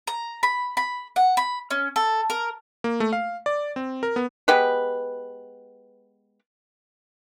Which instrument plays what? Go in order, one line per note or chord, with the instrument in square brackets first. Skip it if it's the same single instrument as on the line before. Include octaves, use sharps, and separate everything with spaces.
[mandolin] A#5
B5
B5
F#5
B5
C#4
A4
A#4
[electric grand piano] A#3
A3
F5
D5
C4
A#4
B3
[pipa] G#3 B3 G4 B4